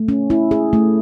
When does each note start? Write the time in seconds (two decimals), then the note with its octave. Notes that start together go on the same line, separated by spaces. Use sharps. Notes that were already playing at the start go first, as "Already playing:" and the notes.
Already playing: A3
0.08 C#4
0.30 E4
0.51 G#4
0.73 A3